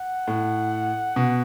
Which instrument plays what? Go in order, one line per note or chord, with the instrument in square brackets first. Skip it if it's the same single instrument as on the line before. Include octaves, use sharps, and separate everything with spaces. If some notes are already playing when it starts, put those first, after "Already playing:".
Already playing: [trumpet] F#5
[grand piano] A2
B2